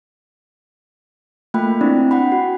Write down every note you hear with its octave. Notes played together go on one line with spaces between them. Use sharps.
A3 A#3 F4 G5 B5
C4 D4 E4 D5
F#5 G5 B5
F#4